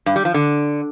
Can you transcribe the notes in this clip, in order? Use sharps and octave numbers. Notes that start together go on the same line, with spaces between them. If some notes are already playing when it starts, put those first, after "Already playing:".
G2
G3
F3
D3